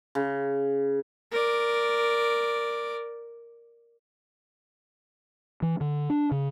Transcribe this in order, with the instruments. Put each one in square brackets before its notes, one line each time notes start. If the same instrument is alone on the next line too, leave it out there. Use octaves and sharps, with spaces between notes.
[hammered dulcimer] C#3
[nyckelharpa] A#4 D5
[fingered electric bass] E3
D3
D4
C#3